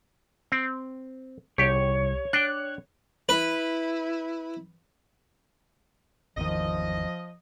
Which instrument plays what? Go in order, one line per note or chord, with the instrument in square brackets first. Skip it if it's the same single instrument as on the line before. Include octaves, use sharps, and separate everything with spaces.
[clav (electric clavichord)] C4
[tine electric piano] C2 [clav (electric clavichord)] G4 [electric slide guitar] C#5
[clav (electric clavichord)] D4 G5 [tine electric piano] F#6
[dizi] E4 [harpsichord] B4
[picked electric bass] G#1 E2 D#3 [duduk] F3 [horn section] D#5